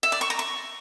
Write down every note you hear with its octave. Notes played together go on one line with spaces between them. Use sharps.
E5
D5
C#6
A#5
C#6